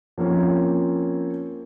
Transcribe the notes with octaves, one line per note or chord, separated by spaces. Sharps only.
F3 A#3 C4 C#4